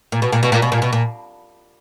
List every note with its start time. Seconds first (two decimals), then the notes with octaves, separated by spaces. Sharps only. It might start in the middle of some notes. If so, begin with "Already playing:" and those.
0.12 A#2
0.22 B2
0.32 A#2
0.43 B2
0.52 A#2
0.62 B2
0.72 A#2
0.82 B2
0.93 A#2